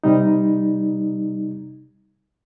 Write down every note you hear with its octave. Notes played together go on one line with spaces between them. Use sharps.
C3 G3 D#4